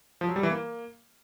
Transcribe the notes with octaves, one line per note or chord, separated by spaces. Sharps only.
F3
F#3
G3
E3
A#3